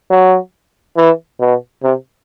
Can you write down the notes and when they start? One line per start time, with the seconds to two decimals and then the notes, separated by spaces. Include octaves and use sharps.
0.11 F#3
0.97 E3
1.40 B2
1.83 C3